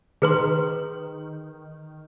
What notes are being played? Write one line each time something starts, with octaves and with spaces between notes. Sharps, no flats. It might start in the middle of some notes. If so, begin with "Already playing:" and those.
D#3 G#4 B4 C6